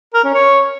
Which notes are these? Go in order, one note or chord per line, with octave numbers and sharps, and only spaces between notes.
A#4
C#4
C#5